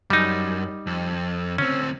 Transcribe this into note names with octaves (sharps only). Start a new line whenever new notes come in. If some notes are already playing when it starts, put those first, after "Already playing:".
F#2 G3 D#4
F2
D2 C4 C#4